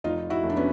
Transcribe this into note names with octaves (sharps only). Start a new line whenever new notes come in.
F1 D#4 F4
E4 F#4
F1
D4
B3 C#4